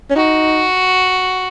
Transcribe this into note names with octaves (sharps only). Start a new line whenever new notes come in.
C#4
D#4 F#4